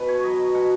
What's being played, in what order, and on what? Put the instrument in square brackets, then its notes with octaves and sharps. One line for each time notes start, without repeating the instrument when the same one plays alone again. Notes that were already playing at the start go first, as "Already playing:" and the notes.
Already playing: [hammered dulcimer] B2 B3 B4
C#5
F#3 D#5
B2 F#5